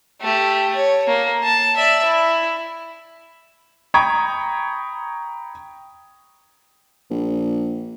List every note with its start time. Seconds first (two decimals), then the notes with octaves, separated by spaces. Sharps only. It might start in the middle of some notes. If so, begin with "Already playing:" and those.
0.21 A3 G4
0.75 C#5
1.07 A#3
1.43 A5
1.76 D5 E5
2.05 E4
3.94 G5 A#5 B5 C#6 D#6 G#6
7.10 A#1